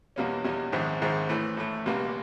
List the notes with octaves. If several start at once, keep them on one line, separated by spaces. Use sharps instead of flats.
E2 B2 G3 A#3 C#4
E2 B2 G3 A#3 C#4
A#1 G#2 D#3 G#3 C4
A#1 G#2 D#3 G#3 C4
A2 E3 A3
A2 E3 A3
C#2 B2 G3 A#3